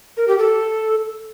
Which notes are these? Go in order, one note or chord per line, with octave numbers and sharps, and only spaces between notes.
A#4
G4
A4